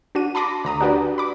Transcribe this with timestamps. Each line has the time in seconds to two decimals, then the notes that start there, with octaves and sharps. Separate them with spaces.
0.15 D4 F#4 D#7
0.35 A5 B5 C6 D6 A#6
0.65 D2 A#5 D#6
0.81 D4 F#4 G4 B4 D5
1.18 B5 D6